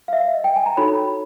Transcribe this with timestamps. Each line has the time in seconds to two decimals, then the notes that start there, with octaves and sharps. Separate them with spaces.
0.08 F5
0.13 E5
0.34 D#5
0.44 G5
0.56 G#5
0.66 A#5
0.77 D#4 F#4 A4 C#5 B5